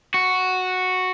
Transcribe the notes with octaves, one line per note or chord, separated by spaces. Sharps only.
F#4